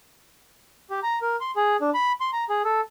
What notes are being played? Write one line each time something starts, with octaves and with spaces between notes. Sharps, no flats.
G4
A#5
A#4
C6
G#4
D4
B5
C6
A#5
G#4
A4